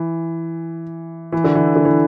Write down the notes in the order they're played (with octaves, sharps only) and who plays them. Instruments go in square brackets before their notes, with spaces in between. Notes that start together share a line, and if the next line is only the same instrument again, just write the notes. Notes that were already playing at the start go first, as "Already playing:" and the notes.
Already playing: [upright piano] E3
E3
D3
E3
D3
E3